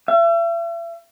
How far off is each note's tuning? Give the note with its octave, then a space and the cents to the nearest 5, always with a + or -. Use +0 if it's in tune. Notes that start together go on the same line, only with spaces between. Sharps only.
E5 +40